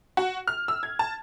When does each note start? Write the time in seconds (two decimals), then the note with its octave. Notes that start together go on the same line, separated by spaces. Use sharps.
0.17 F#4
0.48 F6
0.68 E6
0.83 G#6
0.99 A5